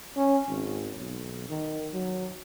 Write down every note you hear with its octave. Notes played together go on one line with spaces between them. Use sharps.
C#4
G#1
B1
D#3
F#3